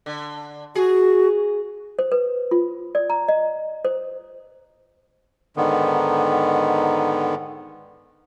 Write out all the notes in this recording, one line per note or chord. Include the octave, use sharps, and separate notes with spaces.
D3
F#4 G#4
C5
B4
F4
D5
A#5
D#5
C5
G#2 D3 D#3 B3